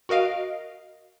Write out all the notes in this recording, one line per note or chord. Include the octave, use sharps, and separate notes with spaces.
F#4 A#4 D#5 F5 D7